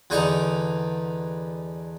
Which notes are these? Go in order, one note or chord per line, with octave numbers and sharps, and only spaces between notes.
E2 D3 D#4 A#5 C#6